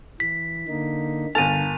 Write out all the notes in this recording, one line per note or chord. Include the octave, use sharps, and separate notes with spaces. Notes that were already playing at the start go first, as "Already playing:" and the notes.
E3 B6
D3 A#3 D#4
G1 D3 A#4 G#5 A5 A6 D#7 F7